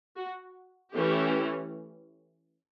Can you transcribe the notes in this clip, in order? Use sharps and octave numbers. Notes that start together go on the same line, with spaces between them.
F#4
E3 A3 C#4 G4